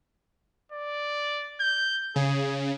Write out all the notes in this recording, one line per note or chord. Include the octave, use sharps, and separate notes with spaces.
D5
G6
C#3 G#4